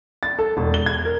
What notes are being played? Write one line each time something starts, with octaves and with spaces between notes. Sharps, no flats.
A6
A4
E1
G7
G#6
A#4